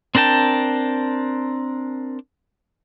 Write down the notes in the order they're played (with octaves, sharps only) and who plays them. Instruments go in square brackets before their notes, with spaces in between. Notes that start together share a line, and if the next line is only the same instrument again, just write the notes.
[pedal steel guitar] C4 D4 A#4 G5 A5